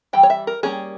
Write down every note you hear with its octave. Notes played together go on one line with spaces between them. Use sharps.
E3 G3 G5
C#5
E5
A#4
G3 A#3 C#4 G#4